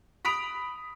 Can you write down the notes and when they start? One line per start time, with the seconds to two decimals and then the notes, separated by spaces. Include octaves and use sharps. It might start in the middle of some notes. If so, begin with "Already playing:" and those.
0.25 B5 D#6 B6 D7 F7